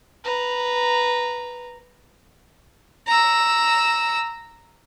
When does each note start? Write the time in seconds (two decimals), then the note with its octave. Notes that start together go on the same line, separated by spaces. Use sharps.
0.24 B4 A#5
3.07 A#5 E6